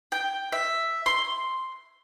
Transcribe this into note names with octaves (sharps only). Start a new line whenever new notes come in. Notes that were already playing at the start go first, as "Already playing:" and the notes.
G5
E5
C6